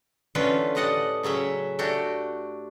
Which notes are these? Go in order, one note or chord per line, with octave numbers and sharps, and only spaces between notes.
D3 E3 A3 C#4 F4 B4
A2 G3 D#5 F#5 A5
C#3 F#3 C#4 E5
A3 D4 F#4 G4